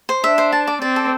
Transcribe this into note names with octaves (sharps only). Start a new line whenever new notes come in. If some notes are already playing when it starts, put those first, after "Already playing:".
C5
D4 E5
C5
A5
D5
C4 D5
A4